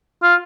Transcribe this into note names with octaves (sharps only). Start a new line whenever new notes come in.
F4